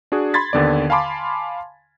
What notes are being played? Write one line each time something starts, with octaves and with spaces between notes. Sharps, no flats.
D4 F#4 G#4
B5 C6 G#6 A6 B6
D#2 D3 B3 D5
F5 G#5 A5 B5 C6 D6